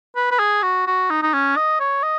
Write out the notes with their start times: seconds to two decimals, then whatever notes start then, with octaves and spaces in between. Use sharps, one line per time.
0.16 B4
0.31 B4
0.39 G#4
0.62 F#4
0.87 F#4
1.10 D#4
1.23 D#4
1.34 C#4
1.57 D#5
1.80 C#5
2.03 D#5